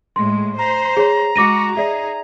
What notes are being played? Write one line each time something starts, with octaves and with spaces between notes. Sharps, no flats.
A2 G#3 C6
C5 A#5
G#4 C#5
G#3 F#4 D6 A#6 D#7
D#4 G#4 D5 E5